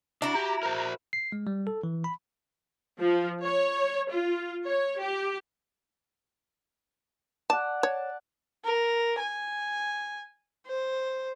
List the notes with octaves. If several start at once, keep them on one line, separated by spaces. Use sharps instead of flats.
D4 E4 F#4 A#5
G4
A#4 C5
C7
G#3
G3
A4
E3
B5
F3
C#5
F4
C#5
G4
D5 F#5 A5
C#5 A5
A#4
G#5
C5